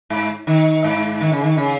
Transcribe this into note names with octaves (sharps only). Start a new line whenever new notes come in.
G#2
D#3
G#2
D#3
C#3
D#3
C#3